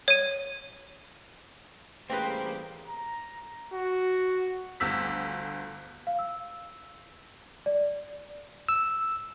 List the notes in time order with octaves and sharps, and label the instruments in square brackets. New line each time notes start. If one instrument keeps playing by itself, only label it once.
[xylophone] C#5 D#7
[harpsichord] A1 G3 [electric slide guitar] A#3 [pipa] C4 B4 [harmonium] G#4 C5
[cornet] A#5
F#4
[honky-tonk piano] G1 D2 E6 B6
[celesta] F5
E6
D5
[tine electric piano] E6